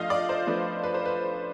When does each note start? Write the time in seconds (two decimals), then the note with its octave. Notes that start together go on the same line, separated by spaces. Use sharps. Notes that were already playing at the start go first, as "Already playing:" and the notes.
Already playing: F3 A3 D4 F4 D#5 F5
0.10 D5
0.29 C5
0.47 F3 A3 D4 F4 B4
0.83 B4
0.94 C5
1.05 B4